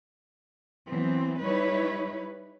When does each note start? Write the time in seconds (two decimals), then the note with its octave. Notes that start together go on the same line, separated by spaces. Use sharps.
0.90 E3 F#3 B3 C4
1.44 G3 D#4 E4 B4 C#5